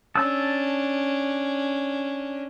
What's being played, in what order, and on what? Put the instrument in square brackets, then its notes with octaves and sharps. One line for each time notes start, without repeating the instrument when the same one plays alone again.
[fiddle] C#4 D4 [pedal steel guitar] A5 E6